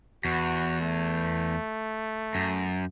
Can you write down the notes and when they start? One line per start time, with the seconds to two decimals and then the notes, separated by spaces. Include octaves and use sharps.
0.25 E2 F#4
0.80 A3
2.35 F#2